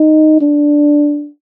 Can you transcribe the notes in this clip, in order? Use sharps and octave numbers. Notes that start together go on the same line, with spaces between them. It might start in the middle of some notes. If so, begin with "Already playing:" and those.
Already playing: D#4
D4